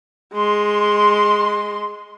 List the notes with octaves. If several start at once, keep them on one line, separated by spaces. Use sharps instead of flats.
G#3 C6